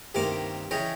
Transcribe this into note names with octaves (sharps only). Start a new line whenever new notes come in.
C2 G2 C3 D#3 A#3 D6
C#3 E3 C#4 D#5 G5